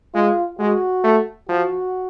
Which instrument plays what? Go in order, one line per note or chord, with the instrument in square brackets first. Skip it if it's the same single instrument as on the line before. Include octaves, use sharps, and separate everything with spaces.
[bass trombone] G#3 [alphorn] F4
[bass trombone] G#3 [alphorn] F#4
[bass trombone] A3
[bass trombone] F3 [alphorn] F#4